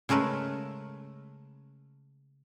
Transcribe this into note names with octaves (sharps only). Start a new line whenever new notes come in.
C#3 G#3 A3 A#4 B4